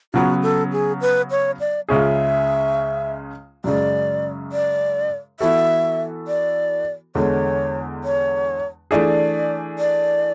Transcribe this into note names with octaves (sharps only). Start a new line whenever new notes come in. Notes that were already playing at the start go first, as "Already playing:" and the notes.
C#3 F#3 B3 F#4
A4
G#4
B4
C#5
D5
C#2 C#3 G#3 C#4 G#4 E5
F#2 C#3 G#3 D5
D5
E3 B3 F#4 A4 E5
D5
E2 D3 G#3 C#5
C#5
E3 A3 D4 G#4 D5 E5
D5